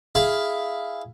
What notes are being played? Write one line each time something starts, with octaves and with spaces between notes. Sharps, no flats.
E4 G#4 F5